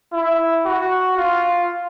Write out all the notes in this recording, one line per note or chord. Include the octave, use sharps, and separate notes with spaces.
E4
F#4
F4